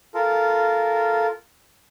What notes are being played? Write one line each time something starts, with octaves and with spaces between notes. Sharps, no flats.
F4 A4 A#4